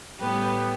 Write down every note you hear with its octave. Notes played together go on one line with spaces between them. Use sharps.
A2 G3 B3 G4 B4